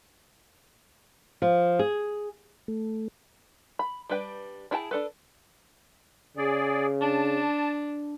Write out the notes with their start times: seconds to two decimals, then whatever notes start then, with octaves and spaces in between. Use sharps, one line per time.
1.42 F3
1.79 G#4
2.68 A3
3.79 B5
4.10 G3 D4 B4 G5
4.71 D4 E4 G#4 G5 A5
4.91 D4 A4 B4
6.37 C#3 G#4 D5
7.01 D4 A5